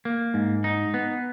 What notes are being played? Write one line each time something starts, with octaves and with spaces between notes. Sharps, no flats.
A#3
G#2
D#4
B3